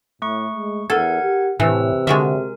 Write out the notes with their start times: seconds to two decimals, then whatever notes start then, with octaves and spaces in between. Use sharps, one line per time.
0.22 A2 A3 C#6
0.52 G#3
0.90 E2 A4 A#4 F#5 G#6
1.22 G4
1.60 A2 C3 E3 B4 E6
2.07 D3 G#3 F#4 A#4 E5